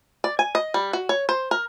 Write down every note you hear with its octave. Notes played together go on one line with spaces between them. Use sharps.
D5
G#5
D#5
G3
F#4
C#5
C5
A#4